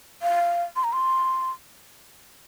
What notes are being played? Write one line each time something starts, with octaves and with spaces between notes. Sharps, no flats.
F5
C6
A#5
C6